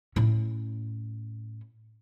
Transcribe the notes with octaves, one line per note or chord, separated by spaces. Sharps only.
A2 C#4